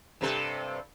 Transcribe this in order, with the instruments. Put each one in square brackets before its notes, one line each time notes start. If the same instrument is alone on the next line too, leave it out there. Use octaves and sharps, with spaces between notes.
[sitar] G2 C3 A4